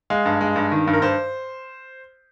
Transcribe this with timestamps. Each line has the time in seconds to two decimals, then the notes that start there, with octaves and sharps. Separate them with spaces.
0.10 G#3 F5
0.26 G2
0.41 G#3
0.56 G2
0.71 D#3
0.87 G2
0.93 A#4
1.02 G2 C5